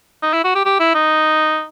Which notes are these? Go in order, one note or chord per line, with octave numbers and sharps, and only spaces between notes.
D#4
E4
F#4
G4
G4
E4
D#4